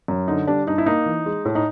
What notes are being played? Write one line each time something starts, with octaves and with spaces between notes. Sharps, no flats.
F#2
D3 D#4
G3 D4
G2 D#4
E4
A#3 D#4
E3
G#3
A2
D#4